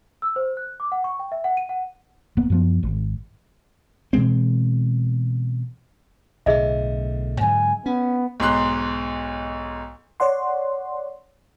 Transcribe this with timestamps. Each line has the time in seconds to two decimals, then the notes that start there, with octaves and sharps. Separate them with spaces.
0.22 E6
0.36 C5
0.57 F#6
0.80 D6
0.92 F#5
1.04 C#6
1.19 G5
1.32 E5
1.44 F#5
1.57 D#7
1.69 F#5
2.37 D1 A#3 B3
2.50 F#2 F3 B3
2.83 G#1
4.13 B2 E3 G#3 C4
6.46 B1 A2 D3 G#4 D#5 E5
7.41 G#2 D3 F#3 G#5
7.86 B3 C#4
8.40 B1 G#2 C6 F#6
10.20 C#5 D5 F#5 C6